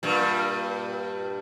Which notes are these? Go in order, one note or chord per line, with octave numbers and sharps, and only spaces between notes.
G2 A#2 G3